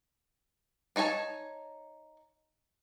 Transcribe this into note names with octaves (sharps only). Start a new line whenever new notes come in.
D4 D#4 C#5 G#5 A5